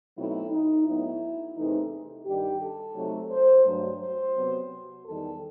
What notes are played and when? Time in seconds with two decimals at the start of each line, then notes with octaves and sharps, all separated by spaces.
0.15 B2 F#3 A3 C4 D#4 E4
0.50 D#4
0.85 A2 F#3 B3 D#4 E4
1.56 E2 C3 E3 A3 D#4
2.25 G2 D#3 G3 D#4 G4
2.61 A4
2.95 C3 F#3 A3 D#4
3.31 C5
3.66 G2 F#3 A3
4.00 C5
4.35 C3 F#3 B3
5.05 E2 D#3 G3 A4